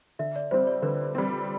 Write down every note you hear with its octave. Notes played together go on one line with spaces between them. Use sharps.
D3 E5
D5
G3 C4 C5
D5
D3 B4
G3 C4